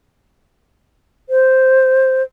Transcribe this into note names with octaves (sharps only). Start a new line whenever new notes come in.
C5